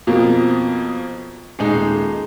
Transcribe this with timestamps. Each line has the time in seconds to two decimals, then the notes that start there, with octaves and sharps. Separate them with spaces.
0.07 F2 B2 F3 A#3
1.59 D#1 G#3 D#4